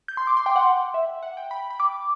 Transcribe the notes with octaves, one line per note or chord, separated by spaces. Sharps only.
G6
C6
D6
C6
G5
F#5
E5
F#5
G5
B5
B5
D6